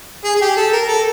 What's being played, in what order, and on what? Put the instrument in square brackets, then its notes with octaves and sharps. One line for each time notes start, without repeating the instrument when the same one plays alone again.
[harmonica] G#4
G#4
G4
A4
A#4
A4